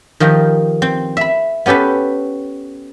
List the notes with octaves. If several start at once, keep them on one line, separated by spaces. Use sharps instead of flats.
D#3 F3 G4 A#4
C4
E5 B5
B3 C#4 G4 A4 B4